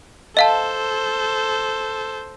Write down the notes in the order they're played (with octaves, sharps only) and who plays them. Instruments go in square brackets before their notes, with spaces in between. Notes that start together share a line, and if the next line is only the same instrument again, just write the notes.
[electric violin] A4 C5 [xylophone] D#5 F5 A5